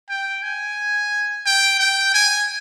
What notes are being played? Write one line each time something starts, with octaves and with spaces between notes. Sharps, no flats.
G5
G#5
G5
G5
G#5